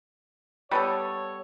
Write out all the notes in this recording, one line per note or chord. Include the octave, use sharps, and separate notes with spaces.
G3 B3 A4 C#5